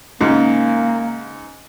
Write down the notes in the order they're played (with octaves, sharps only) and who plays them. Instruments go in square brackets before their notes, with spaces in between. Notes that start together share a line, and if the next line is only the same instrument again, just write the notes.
[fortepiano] G#2 C#3 [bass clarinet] A#3